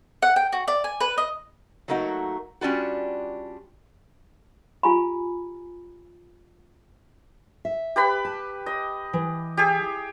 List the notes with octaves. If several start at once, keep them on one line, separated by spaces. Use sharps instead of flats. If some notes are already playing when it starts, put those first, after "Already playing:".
F#5
G5
F#4
D5
G#5
B4
D#5
F#3 A3 A#3 D#4 F#4
G3 C#4 D4 F4 F#4
F4 G4 G#5 A#5 B5
E5
G4 B4 B5
A5
D#5
E3
G4 G#4